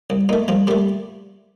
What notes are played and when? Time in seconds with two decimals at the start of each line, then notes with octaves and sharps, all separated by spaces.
0.10 C2
0.29 A#2 A3 D#4
0.48 C2 F3 F4
0.67 A#2 G3 A3 G4